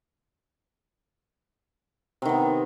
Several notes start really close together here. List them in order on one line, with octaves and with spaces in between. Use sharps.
C3 D#3 B3